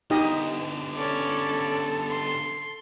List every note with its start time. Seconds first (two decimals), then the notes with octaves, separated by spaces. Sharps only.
0.10 D3 B3 D#4 G4 D#5
0.95 C#4 A4 D5
2.09 C6